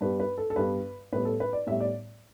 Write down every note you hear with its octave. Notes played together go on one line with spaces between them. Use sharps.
G2 G3 B3 B4
B4
A4
A4
G2 G3 B3 B4
A2 G3 B3 B4
A4
B4
D5
A2 G3 B3 E5
D5